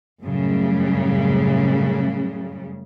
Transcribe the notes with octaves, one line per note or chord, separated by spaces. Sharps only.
F#2 A2 C#3 G3